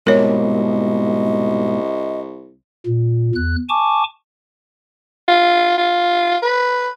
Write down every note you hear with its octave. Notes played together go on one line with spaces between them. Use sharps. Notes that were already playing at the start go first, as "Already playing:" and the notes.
C2 G#2 B2 A#3 A#4 C#5 D#5
A#2
E2 F#6
G#5 A5 C#6 D6
F4
F4
B4